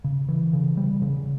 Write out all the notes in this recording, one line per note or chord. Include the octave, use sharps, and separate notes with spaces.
C#3
E3
C#3
G3
C#3